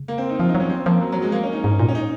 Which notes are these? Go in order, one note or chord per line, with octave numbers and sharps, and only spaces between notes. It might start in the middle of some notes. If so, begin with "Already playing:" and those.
Already playing: C#3
A#3
C4
D#4
F3 F4
D#4
F#3
C#4
C4
F3 A#3
F#3
F#3
G#3
A#3
C#4
D#4
G#2 D#4
A#2 D#4
C#4
D#4